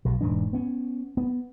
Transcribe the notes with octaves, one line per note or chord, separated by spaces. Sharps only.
B1 B2
E1 G#2 E3 D4
B3 C#4
B3